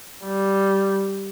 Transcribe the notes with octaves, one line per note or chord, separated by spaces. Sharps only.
G3